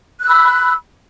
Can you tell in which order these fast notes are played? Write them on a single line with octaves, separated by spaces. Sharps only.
F#6 E6 B5